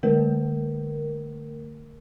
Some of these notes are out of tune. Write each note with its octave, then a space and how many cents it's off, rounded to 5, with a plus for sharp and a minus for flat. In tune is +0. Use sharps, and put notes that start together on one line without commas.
D3 +10 A3 +35 A#4 +0